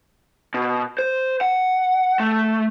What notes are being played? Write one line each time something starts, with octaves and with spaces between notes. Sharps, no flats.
B2
C5
F#5
A3